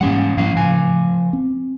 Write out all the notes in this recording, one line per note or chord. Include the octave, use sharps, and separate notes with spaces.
G#2 E3 G3 A#3 C#4 F#5
G#2 E3 F3 A#3 F5
A2 C#3 F3 G#5
C4